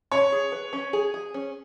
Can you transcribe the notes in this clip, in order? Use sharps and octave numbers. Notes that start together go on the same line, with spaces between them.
C#4 C#5
G#4
B4
C#4
G#4
G#4
C#4